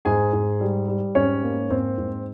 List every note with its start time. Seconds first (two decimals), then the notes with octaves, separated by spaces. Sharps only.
0.05 G#2 G#4 G#5
0.33 G#2
0.60 G3
0.88 G3
1.15 G#2 C#4 C#5
1.44 A#3
1.70 G#2 C4 C5
1.98 G#2